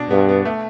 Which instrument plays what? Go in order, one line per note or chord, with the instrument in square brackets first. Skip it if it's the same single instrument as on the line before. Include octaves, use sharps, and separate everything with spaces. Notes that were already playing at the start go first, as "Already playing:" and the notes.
Already playing: [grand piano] B2 D4
[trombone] G2 [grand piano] B3
[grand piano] B3
A3